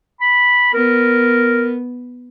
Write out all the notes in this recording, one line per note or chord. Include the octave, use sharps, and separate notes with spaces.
B5
B3 A#4